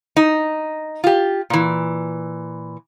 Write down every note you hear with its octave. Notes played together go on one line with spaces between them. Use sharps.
D#4
F4 G4
A#2 E3